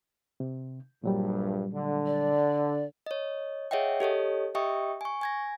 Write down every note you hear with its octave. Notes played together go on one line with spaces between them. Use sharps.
C3
A#1 G2 A#2 F#3 G3
D3
D5
C#5 D#5
G#4 C#5 D#5 E5 F#5 G5
G4 A4 C#5 D#5
G4 D#5 E5 G5 C#6 D#6
G#5 C#6
G#5 G#6 A#6